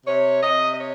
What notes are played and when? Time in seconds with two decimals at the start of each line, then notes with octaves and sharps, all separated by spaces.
0.05 C3 C#5
0.42 C3 D#5
0.73 D#5
0.79 C#5